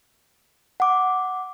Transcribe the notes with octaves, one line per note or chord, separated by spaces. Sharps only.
F#5 D6